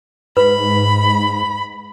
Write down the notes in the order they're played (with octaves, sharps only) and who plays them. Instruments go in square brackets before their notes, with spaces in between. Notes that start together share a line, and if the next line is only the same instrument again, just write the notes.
[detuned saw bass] G#2 [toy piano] B4 [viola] B5